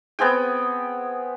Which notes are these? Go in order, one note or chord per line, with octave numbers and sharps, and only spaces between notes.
B3 C4 G#4 G5